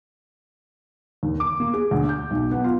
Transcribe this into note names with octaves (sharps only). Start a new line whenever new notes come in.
D#2
D6
A#3
G#4
D2
G6
B1
B3
F4